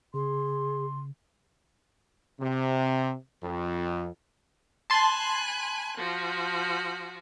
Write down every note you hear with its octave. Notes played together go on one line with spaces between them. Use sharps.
C#3 G#4 C6
C3
F2
G#5 A5 B5 C6 F#6
F3 F#4